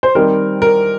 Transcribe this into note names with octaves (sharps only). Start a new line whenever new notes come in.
C5
D#3 G3 C4 D#4 A#4
A#4